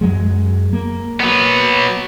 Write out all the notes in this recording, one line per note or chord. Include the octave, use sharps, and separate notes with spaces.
F#2 F#3 G#3
A#3
F#3 B3